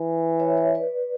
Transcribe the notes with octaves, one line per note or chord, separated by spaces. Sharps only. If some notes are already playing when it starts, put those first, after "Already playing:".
Already playing: E3
C#5 E5
C#5 E5
B4 D5